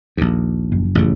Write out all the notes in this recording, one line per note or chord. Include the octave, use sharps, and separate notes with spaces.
A#1 D#2
F#1
A1 F2 C#3